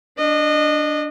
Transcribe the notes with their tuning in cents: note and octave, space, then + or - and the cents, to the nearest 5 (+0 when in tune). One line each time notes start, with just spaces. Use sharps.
D4 +0 D#5 -25